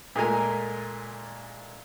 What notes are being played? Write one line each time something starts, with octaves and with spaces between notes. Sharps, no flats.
A#2 G#3 A3 A#4 G#5 A#5